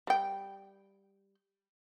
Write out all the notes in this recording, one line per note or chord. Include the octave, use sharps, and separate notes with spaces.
G3 G5